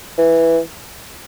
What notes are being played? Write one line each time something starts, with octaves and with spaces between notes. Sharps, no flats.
E3